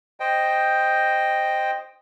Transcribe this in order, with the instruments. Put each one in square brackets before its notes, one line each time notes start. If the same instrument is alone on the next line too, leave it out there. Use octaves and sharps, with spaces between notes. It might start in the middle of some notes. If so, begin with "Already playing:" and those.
[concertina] C5 D#5 G5